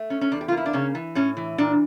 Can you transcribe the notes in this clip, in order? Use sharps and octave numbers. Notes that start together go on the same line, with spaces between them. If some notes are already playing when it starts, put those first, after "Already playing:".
Already playing: A3
C#4
C#4
E2 D4
G4
F4
A#3
E4
D4
C#3 C#4
E3
A2 C#4
E3
A#2 D4